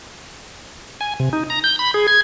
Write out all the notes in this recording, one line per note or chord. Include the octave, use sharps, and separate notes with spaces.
G#5
C3
D#4
A#5
G6
B5
G#4
G#6